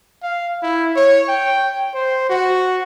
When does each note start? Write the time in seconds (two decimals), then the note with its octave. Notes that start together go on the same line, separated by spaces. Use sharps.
0.23 F5
0.62 E4
0.96 C#5
1.28 G5
1.94 C5
2.30 F#4